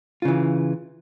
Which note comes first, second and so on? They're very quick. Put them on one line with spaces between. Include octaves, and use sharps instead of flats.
F4 C#3 E3